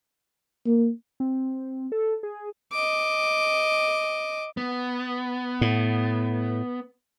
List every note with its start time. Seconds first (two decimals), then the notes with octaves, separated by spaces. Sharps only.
0.66 A#3
1.20 C4
1.92 A4
2.23 G#4
2.72 D#5 D6
4.57 B3
5.61 A2